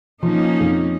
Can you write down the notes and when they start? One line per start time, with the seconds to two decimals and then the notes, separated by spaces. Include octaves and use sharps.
0.23 F3 A#3 C#4 D#4
0.60 F2